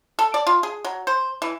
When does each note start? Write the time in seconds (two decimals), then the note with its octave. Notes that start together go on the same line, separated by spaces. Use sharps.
0.19 A4
0.34 D5
0.47 F4
0.63 G#4
0.84 F#3
1.07 C5
1.42 E3